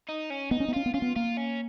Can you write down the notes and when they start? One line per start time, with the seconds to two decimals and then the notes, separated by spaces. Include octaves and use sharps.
0.09 D#4
0.30 C#4
0.51 B3 D#4
0.60 C#4
0.68 B3
0.74 C#4 F4
0.86 B3
0.94 C#4 F4
1.02 B3
1.16 A#3 F4
1.37 C#4